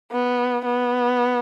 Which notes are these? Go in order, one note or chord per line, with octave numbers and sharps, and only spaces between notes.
B3
B3